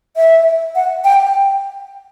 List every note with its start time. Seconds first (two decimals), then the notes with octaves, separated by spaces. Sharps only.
0.17 E5
0.75 F#5
1.04 G5